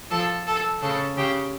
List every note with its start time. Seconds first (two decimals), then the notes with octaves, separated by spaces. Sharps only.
0.11 F3 A4
0.47 A4
0.82 C#3 A4
1.17 C#3 G4